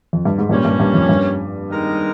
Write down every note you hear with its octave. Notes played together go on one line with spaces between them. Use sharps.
F2
G2
G#2
G2 A#2 G3 A#3 C#4
G2
G2
F2
G2
D#3 G#3 C4 D#4 A#4